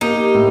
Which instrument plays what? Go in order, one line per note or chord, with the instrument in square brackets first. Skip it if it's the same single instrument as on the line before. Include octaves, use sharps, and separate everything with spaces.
[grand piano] A#3 [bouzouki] D#4 G4
[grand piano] A2